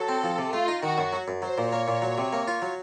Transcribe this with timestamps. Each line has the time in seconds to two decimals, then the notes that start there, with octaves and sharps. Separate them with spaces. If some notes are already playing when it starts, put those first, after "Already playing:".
Already playing: F#3 A4
0.08 C4
0.23 F3
0.38 C3
0.53 A3 F4
0.68 D#4
0.83 D#3 F#4
0.98 F#2
1.13 F#3
1.28 F#2
1.42 F#3 C5
1.58 A#2
1.73 A#3 C#5
1.88 A#2
2.02 F#3
2.18 C3
2.33 A#3
2.48 F4
2.62 F#3